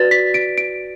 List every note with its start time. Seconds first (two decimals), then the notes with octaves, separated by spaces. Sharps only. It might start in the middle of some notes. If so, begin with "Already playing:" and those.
Already playing: F#4 B4 D5 A6
0.11 B6
0.34 D7
0.58 D7